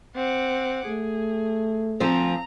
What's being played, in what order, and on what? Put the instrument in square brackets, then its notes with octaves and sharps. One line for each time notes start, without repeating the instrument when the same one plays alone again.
[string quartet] C4 F#5 D6
[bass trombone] A3 [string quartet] G#4
[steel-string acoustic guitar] D2 F3 C4 [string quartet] A#5